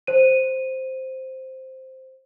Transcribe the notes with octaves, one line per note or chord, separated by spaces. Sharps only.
C5 D#7